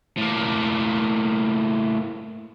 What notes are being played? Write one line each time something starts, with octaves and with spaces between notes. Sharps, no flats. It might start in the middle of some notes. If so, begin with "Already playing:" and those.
A2 A#3